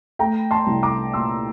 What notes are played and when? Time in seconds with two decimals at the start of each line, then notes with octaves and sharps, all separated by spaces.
0.19 A3 G5 A#5
0.51 A5 C6
0.66 C2
0.83 A#5 D6
1.13 A#2 C6 E6